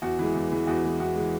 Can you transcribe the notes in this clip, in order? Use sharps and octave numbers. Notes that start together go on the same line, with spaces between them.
E2 F#4
E3 G#3
E2
E3 G#3
E2 F#4
E3 G#3
E2 F#4
E3 G#3